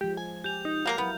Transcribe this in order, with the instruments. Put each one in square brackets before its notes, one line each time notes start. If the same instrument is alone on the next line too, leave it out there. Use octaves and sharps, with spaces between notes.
[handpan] F3 G#3 [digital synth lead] G4
[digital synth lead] G#5
[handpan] G4 [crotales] G6 F7
[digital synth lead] D#4
[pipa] F#3 A#3 A#4 [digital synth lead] F5
[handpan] F#3 E4 A#4 [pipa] B3